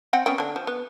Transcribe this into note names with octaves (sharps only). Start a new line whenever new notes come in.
C4 F#5 G5
B3 C#4 G5
D3 D4
F3
B3